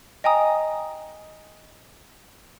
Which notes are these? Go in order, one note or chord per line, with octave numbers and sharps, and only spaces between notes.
D#5 G5 G#5 A#5 D#6